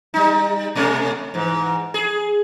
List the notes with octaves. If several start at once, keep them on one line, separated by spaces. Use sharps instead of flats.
G3 D#4
B2 A3 C#4
G#2 E3
G#4